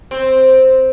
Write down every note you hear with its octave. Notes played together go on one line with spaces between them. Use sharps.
C4